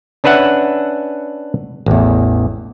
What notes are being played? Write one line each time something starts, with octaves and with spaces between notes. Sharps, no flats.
C#4 D4 B4 E5 F#5 G#5
A1 E2